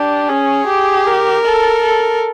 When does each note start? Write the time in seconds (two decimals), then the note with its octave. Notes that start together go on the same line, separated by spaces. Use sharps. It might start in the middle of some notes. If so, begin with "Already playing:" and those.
Already playing: D4 G4
0.29 C#4 G#4
0.67 G4
1.07 A#4
1.45 A4
1.84 A4